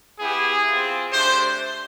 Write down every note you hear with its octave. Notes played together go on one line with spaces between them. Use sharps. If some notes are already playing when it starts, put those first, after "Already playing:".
B3 E4 G4 G#4
C4 F4
A3 D4 G4 C5